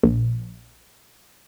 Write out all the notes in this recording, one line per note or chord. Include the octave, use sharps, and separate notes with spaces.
A#1